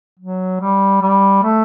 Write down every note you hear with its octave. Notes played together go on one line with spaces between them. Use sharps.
F#3
G3
G3
A3